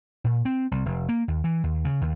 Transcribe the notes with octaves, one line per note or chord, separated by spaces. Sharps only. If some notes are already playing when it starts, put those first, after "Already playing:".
A#2
C4
C2
F1
A#3
D#2
E3
D#2
C#3
D#2